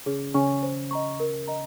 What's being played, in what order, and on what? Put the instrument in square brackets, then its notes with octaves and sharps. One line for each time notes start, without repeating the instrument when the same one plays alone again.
[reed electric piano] C#3 C#4 [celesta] G#4
[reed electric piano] C#3 C#4 [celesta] C#5 G#5 C#6
[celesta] C5
D#5 A#5 C#6
A#4
D#5 A#5